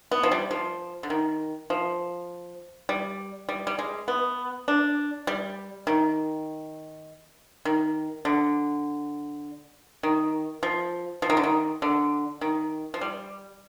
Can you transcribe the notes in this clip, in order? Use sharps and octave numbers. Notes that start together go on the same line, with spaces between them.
B3
F3
G3
F3
D3
D#3
F3
G3
G3
G3
G#3
B3
D4
G3
D#3
D#3
D3
D#3
F3
F3
D#3
D3
D#3
D3
D#3
F3
G3